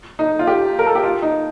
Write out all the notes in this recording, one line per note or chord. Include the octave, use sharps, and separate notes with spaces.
D#4
F4
G4
A#4
A4
G4
F4
D#4